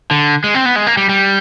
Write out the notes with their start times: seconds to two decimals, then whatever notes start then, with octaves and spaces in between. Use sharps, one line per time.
0.11 D3
0.44 G#3
0.54 C4
0.66 B3
0.76 G#3
0.87 A#3
0.97 G3
1.09 G3